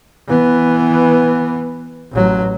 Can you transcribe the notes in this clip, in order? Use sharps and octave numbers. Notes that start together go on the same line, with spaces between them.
E3 B3
A1 F#3